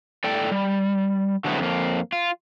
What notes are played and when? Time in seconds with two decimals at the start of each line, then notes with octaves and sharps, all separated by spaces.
0.24 A2 A4 D5 G5
0.51 G3
1.44 D3 F#3 G#3 B3 C4 E4
1.59 F2 A#3
2.12 F4